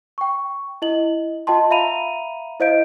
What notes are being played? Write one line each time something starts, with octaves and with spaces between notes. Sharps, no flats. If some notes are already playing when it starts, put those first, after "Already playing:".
G5 C#6
E4 D#5 F#7
F4 D#5 G5 A5 C6
E5 F5 A#5 B5 D#7 F7
E4 C5 D#5 F5 G6 D7